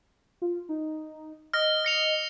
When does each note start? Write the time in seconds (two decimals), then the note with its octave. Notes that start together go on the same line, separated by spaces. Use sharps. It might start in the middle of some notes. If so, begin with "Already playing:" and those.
0.42 F4
0.69 D#4
1.53 D#5 F6 A#6
1.85 A#6 C#7 F7